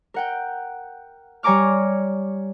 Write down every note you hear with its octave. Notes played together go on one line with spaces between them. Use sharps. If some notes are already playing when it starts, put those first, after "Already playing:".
A#4 F#5 G5
G3 C#5 G#5 A#5 D6 F6